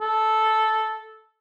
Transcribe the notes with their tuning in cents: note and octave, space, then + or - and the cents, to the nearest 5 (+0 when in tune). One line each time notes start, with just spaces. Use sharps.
A4 -10